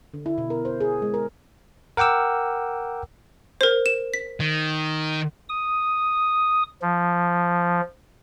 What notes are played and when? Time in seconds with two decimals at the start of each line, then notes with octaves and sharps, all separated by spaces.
0.14 D3
0.26 E4
0.38 B2
0.50 A#4
0.65 C5
0.80 G#4
1.02 G#3
1.14 A#4
1.97 A#4 F#5 G5 D6 E6
3.61 A#4 C5
3.86 E7
4.14 B6
4.40 D#3
5.49 D#6
6.82 F3